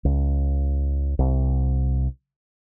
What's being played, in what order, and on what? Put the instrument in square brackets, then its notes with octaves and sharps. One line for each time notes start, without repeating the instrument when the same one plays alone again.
[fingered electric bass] C#2
C2